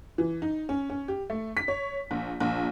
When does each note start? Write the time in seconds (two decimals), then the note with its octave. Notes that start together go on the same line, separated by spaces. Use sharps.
0.18 E3
0.42 D#4
0.69 C#4
0.90 C#4
1.08 G4
1.30 A3
1.57 B6
1.68 C#5
2.11 A#1
2.40 A#1